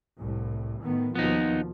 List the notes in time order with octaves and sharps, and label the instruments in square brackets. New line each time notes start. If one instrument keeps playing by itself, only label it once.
[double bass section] C2 A2
A2 D#3 B3
[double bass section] D#2 B2 F3 [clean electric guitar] B3 D#4